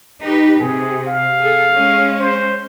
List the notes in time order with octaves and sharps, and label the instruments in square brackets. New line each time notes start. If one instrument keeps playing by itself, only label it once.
[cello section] D#4 G4 B4
[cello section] C3 [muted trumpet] G#4
[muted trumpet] F5
[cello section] G#4 A4
G#3 C#4
[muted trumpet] C5